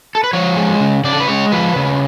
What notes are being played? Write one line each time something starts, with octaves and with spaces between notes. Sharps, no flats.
A4
B4
F3 C#5
G#3
C#3
C#3 D5
A4
B4
G#3 C#5
F3 B4
C#3